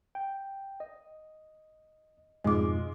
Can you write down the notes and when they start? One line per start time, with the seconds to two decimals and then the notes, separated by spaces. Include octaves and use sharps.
0.15 G5
0.80 D#5
2.44 F2 G#2 B2 G#3 F4 D#5 D6